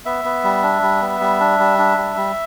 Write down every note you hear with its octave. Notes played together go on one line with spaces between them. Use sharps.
B3 E5
B3
G3
D4
G3
B3
G3
D4
G3
D4
G3
G3